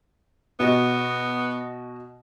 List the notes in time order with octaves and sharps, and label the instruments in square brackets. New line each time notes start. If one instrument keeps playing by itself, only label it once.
[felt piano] B2 F#4 D#5 [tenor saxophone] B3